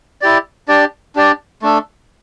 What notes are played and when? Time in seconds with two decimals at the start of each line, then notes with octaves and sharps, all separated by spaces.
0.21 E4 G4 D5
0.68 D4 G4 D5
1.16 D4 G4 D5
1.62 A3 D4 A4